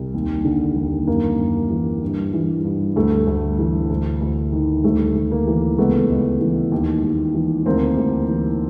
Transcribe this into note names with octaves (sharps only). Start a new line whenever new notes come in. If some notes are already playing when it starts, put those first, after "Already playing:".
Already playing: C2
D#2
D3
D#2
F#2 A#3
F#2
E3
G2
E3
G2
D2 A3
D2
E3
D2
D2
D#3
D2 A3
D2
A#3
E3
C#2 A3 B3
C#2
E3
D#2
D#2
E3
D2 A#3 C4
D2
E3